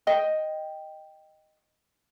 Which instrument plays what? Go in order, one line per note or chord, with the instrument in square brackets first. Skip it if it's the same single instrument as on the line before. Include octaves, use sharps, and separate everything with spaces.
[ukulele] D#5 G5